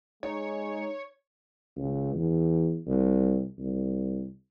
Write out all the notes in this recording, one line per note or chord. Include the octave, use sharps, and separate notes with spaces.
G#3 D#4 C#5
C#2
E2
C2
C2